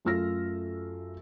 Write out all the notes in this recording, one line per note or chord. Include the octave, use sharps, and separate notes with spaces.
F#2 A3 F4 E6 F6 A#6